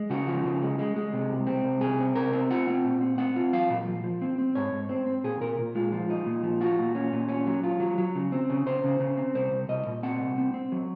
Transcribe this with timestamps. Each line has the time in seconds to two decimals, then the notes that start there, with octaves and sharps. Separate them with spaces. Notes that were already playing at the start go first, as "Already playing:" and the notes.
Already playing: G#3
0.10 C#3 F#4
0.27 F3
0.45 C#3
0.62 G#3
0.79 G#3
0.96 G#3
1.13 C3
1.31 C2
1.47 C4
1.64 C2
1.81 C3 G#4
1.99 C4
2.16 C3 A#4
2.32 C4
2.51 F4 F#5
2.67 C4
2.85 A#2
3.01 C4
3.18 C4 F#5
3.36 F4
3.53 F#3 F5
3.70 A#2
3.88 F3
4.04 F3
4.22 C4
4.39 C4
4.55 G#2 C#5
4.73 G#2
4.89 C4 C5
5.07 C4
5.24 A#2 G#4
5.40 A#2 A#4
5.59 A#2
5.75 G#3 F4
5.92 F3 F4
6.10 D#4
6.26 A#2
6.43 F3
6.61 F4 F#4
6.78 A#2
6.95 C#4
7.13 A#2
7.29 C#4
7.46 F#3
7.63 F4
7.80 F#3
7.98 F#3
8.15 C#3
8.32 C4
8.50 C#3
8.66 C#3 C5
8.84 C#3
9.00 C#3
9.17 C4
9.35 C2 C5
9.51 C2
9.69 C2 D#5
9.87 A#2
10.03 C4 F#5
10.20 C2
10.38 C4
10.54 C4
10.72 F#3